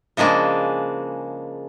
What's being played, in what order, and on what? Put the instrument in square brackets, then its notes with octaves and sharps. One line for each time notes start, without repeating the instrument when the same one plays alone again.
[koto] C#3 F3 G#3 A#3 D4